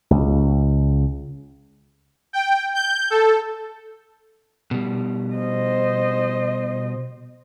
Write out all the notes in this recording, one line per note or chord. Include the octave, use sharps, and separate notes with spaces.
C#2
G5
G6
A4
B2 G3
C5 D#5